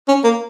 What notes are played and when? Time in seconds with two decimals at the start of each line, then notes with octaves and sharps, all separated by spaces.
0.08 C#4
0.24 A#3